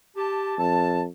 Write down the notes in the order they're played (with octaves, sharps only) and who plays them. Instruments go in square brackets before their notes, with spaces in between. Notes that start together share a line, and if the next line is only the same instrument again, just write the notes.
[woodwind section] G4 A5
[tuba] F2 [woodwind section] A5